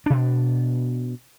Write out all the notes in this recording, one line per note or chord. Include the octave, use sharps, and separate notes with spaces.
B2 D4